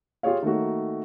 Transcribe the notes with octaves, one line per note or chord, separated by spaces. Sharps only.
F4 G4 G#4 C#5 F5
D#3 A3 A#3 F#4